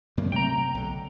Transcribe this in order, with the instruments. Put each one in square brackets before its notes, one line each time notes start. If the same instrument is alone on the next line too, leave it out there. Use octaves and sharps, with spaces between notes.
[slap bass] F#2 D#3 A#3
[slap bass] C3 F#3 A3 [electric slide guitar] G5 A#5
[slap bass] B1 D3